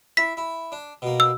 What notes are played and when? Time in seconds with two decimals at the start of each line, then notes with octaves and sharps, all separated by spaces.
0.17 E4 B6
0.37 E4
0.72 D4
1.02 B2 A#3
1.20 E6